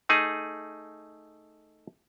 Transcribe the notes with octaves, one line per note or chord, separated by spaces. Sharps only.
A3 D#4 G#4